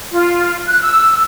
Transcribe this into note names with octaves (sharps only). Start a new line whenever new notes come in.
F4
F#6
E6